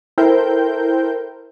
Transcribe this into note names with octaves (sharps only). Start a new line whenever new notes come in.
E4 A4 A#4 C5 G5 G6